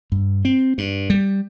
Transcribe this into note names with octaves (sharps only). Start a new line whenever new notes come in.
G2
C4
G2
G3